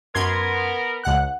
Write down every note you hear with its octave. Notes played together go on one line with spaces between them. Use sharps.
F#2 B3 A#4 C6 G#6
C#2 F#5 F#6